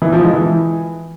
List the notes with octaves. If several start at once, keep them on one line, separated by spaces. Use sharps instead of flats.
E3
F3
G#3
E3